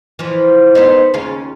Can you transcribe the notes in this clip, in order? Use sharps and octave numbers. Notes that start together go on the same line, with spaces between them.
E3 F3
B3 C4 D#4
D#2 C#3 F4